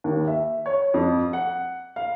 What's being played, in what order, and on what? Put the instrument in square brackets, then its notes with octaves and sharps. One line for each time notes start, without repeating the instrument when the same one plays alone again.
[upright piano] D#2
E5
C#5
F2
F#5
F5